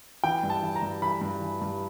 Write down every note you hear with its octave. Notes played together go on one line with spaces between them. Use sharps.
E3 G5
G2
A5
E3
A#5
G2
E3 B5
G2
E3
G2